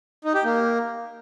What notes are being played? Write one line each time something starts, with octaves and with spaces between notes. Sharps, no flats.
D#4
G4
A#3